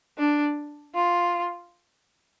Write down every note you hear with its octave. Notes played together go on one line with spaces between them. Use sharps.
D4
F4